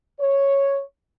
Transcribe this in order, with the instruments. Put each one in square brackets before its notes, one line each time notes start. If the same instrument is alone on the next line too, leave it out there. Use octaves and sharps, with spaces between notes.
[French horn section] C#5